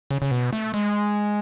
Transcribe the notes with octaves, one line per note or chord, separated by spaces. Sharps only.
C#3
C#3
B2
A3
G#3